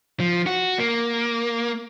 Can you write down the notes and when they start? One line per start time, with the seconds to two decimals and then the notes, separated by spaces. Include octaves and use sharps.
0.20 F3
0.46 F#4
0.79 A#3